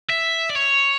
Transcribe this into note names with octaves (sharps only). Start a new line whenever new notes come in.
E5
D5
C#5